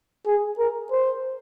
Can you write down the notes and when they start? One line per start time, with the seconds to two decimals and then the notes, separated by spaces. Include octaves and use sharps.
0.26 G#4
0.59 A#4
0.92 C5